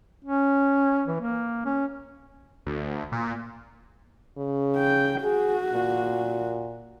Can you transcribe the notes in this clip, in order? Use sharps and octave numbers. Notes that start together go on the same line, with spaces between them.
C#4
E3
A#3
C#4
D2
A#2
C#3
G5
F#4 G#4
A#2